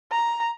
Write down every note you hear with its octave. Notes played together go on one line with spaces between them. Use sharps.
A#5